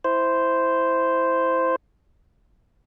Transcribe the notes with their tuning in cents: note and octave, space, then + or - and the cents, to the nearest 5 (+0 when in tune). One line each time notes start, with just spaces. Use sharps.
E4 +0 C5 -5